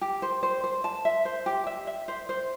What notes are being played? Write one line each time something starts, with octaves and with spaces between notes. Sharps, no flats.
G4
C5
C5
C5
A5
E5
C5
G4
E5
E5
C5
C5